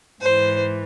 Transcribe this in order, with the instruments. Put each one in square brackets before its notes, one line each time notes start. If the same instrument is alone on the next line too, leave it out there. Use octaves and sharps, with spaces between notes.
[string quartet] G#2 E3 C5